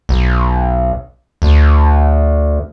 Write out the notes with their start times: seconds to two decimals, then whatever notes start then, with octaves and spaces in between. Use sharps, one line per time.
0.09 B1
1.42 D2